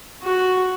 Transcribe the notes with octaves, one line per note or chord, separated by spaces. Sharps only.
F#4